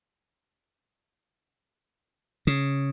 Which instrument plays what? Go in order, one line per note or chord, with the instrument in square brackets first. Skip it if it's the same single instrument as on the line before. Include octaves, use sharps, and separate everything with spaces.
[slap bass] C#3